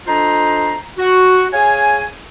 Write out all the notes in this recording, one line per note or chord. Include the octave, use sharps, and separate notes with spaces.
D4 F4 A4 C5 D#5 A#5
F#4
G#4 C#5 F5 G#5